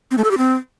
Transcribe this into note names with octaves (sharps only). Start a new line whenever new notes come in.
C4
A3
A4
G4
C4